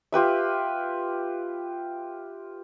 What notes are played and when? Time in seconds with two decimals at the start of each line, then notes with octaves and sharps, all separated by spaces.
0.12 F4 G4 B4 E5